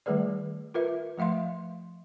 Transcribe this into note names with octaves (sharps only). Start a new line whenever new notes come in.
D#3 G3 A3 G#4 B4 D5
F4 A#4 B4 E5
F3 A3 E5 F5 C6